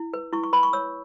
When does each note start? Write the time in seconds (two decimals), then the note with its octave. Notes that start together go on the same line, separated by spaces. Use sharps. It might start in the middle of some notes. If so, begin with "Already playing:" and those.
Already playing: E4
0.14 B4
0.33 E4 C#6
0.44 C#6
0.53 B4 B5
0.63 C#6
0.73 C#5 E6